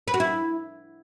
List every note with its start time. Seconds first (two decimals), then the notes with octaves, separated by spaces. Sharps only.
0.08 B4
0.14 F#4
0.20 E4